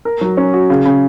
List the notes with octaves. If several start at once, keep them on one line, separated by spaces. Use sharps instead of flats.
A#4
F#3
C#4
F#4
C#3
C#3